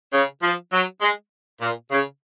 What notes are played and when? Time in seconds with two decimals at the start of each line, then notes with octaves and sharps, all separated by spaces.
0.13 C#3
0.43 F3
0.73 F#3
1.02 G#3
1.62 A#2
1.91 C#3